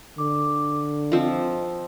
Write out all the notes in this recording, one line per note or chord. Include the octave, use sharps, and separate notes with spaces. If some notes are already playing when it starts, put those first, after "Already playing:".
D3 D6
F3 C4 D#5